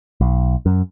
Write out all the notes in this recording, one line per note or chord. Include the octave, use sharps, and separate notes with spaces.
B1
F#2